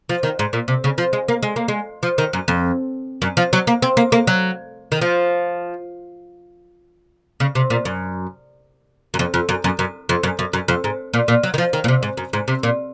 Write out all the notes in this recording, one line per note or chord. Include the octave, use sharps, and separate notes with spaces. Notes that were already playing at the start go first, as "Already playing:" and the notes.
F3
D#3
G#2
A#2
C3
C#3
F3
G#3
A#3
G#3
A#3
G#3
F3
D#3
F#2
F2
F#2
F3
F#3
A#3
C4
A#3
A#3
F#3
D#3
F3
C#3
C3
A#2
F#2
F#2
F2
F2
F#2
F#2
F#2
F2
F#2
F#2
F#2
F2
G#2
A#2
A#2
F#3
D#3
F3
D#3
A#2
C3
G#2
F#2
G#2
C3
A#2